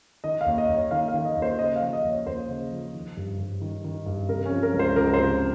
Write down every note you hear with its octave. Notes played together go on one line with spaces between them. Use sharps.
D#3 D#5
F5
D#2
D#5
D#2
C#5
D#3 F5
F5
D#3
D#5
D#2
C5
C#3 D#5
F5
F3
D#5
D#2
C#5
D#2 C5
C#3
F3
D#3
G2
G2
D#3
D#3
G2
C3 A#4
C#4
F3
A#4
C#2
C5
C#2 A#4
C5
C3